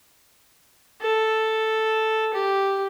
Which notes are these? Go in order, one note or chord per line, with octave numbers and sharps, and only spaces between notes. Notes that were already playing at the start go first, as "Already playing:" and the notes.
A4
G4